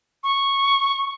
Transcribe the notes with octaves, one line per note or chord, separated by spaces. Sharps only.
C#6